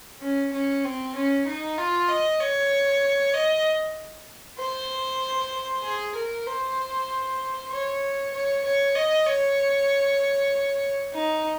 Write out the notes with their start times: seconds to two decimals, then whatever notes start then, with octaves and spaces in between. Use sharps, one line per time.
0.21 C#4
0.53 C#4
0.84 C4
1.15 C#4
1.46 D#4
1.78 F4
2.09 D#5
2.40 C#5
3.34 D#5
4.59 C5
5.83 G#4
6.15 A#4
6.46 C5
7.71 C#5
8.34 C#5
8.64 C#5
8.95 D#5
9.27 C#5
11.14 D#4